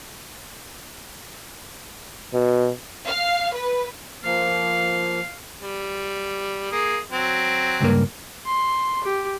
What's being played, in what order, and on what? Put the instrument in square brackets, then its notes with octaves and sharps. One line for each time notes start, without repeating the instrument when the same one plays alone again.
[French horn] B2
[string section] F5
B4
[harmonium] F3 A#3 [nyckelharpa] F5
[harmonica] G3
A#3 G#4
F#3 C4
[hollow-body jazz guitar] C#2 G2 A#3
[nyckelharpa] C6
G4